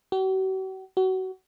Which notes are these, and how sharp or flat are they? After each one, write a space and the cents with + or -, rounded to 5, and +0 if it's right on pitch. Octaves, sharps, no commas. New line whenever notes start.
F#4 +45
F#4 +25